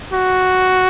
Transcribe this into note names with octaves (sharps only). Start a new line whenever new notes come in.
F#4